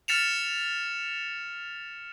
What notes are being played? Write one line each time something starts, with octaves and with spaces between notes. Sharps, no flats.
F6 A6 B6 C#7 E7 F7